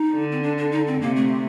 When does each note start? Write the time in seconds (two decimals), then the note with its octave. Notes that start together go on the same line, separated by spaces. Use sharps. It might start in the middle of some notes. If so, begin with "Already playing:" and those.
Already playing: D#4
0.13 D3
0.32 C4
0.43 D4
0.58 D4
0.72 D#4
0.87 C4
1.01 C3 A#3
1.16 A3